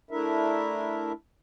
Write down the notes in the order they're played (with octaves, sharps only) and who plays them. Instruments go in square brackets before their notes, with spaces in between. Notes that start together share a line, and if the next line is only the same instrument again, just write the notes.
[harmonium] A3 D4 E4 A#4 E5